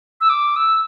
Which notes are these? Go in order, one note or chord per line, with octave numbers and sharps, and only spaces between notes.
E6
D6
E6